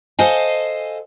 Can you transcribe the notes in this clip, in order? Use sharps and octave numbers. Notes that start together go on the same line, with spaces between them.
A4 C5 D#5 F5 G#5